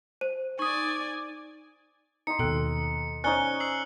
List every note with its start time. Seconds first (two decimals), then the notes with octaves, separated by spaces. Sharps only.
0.21 C5 D#7
0.59 D#4 D5 G#5 C#6 D#6
2.27 D#4 C6 C#7
2.39 D#2 B2 A4 G5 F#6
3.24 C#4 D#4 C5 D5 D#5 F#6 C#7 G7
3.60 E6 C7 F#7